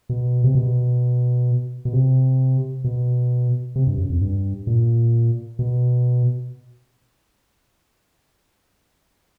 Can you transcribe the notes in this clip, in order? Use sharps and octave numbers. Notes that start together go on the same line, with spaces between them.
B2
C3
B2
B2
C3
B2
C3
G2
F#2
F2
G2
A#2
B2